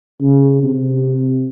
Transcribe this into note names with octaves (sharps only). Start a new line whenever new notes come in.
C#3
C3